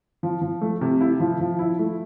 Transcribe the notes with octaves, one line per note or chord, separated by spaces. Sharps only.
F3
F3
A3
C3
E4
F3
F3
E4
A3